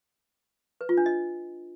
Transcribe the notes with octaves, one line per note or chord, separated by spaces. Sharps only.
B4
F4
D4
D#5